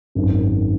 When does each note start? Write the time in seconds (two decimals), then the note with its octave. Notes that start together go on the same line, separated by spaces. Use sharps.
0.15 G#1 F#2 D#3